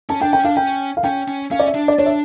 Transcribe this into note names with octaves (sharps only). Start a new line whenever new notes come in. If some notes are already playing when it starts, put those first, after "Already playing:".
C#4 A5
D4 G5
C#4 G5
D4 F5
C#4 G5
F5
C#4 G5
C#4
C#4 F5
D5
E5
D4
D5
D4 C#5
E5